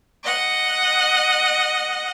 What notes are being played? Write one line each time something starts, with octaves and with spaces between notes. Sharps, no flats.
D#5 F#5